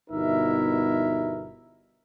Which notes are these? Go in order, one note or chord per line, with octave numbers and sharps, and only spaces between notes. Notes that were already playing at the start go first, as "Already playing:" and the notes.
G1 B2 D#4 E4 A#4 E5